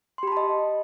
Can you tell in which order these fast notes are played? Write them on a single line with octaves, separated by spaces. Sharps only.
C6 G4 B5 A5 D#5